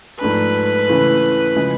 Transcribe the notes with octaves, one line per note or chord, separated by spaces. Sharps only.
G#2 F3 A3 D4 B4
C#3 E3 A3
C#3 F3 G#3